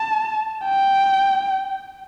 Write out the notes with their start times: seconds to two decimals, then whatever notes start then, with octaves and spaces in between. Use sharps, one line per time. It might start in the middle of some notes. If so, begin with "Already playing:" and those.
Already playing: A5
0.65 G5